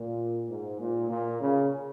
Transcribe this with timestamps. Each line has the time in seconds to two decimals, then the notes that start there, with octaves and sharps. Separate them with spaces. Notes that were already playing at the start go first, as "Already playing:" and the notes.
Already playing: A#2
0.49 G#2
0.80 A#2
1.09 A#2
1.41 C#3